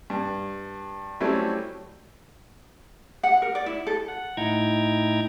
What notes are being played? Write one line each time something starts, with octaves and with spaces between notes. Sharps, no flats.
G2
F#3 G3 A3 C4 C#4 E4
F#5
A#4
D5
E4
A4
F#5
A2 D#4 E4 G5 A#5 G#6